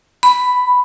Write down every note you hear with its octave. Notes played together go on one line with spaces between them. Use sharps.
B5